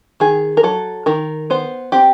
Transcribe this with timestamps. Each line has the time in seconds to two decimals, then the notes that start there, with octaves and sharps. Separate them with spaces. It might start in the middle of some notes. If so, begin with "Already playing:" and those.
0.20 D#3 G#4
0.57 A#4
0.63 F#3 A4
1.06 D#3 A#4
1.50 B3 C5
1.92 C4 G4